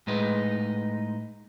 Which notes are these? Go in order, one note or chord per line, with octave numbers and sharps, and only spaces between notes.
A2 G#3 D#4 B4